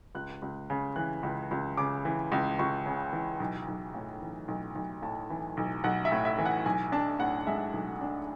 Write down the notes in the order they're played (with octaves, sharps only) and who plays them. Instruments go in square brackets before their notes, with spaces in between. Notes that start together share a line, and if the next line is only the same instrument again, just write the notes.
[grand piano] C#2 F#6
C#2
C#3
E3 F#6
C#2
C#2
C#3 D6
E3
C#2
C#2 C#6
C#3
E3
B1
B1
A2
E3
B1
B1
A2 A5
E3
B1
B1 F#5
E5
A2
E5
E3
F#5
B1 G#5
D4 A5
A2 F#5
G#3 E5
B1
D4